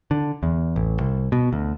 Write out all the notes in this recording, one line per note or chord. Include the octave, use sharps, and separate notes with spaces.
D3
E2
A1
C2
B2
D2